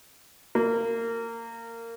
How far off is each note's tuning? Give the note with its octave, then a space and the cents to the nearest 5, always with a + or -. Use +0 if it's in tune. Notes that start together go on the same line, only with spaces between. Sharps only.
A#3 -20